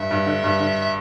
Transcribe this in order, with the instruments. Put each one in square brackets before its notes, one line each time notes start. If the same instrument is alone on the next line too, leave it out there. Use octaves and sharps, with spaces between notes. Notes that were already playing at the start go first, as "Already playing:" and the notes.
Already playing: [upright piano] G2 [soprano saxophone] E5
[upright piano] G2
D3
G2
D3
[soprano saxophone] E5